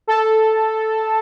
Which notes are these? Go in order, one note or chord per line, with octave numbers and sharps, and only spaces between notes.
A4